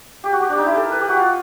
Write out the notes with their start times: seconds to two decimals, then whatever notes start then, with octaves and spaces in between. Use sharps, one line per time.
0.24 G4
0.32 F#4
0.41 G4
0.49 D4
0.58 D#4
0.66 E4
0.75 A4
0.83 A#4
0.91 B4
1.00 G4
1.08 F#4
1.17 F4